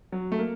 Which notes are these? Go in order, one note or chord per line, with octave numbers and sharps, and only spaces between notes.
F#3
A3
A#3